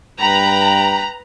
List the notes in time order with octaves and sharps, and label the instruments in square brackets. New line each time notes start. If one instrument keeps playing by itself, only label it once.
[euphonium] G2 [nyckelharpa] B4 B5 [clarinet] G5 [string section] A#5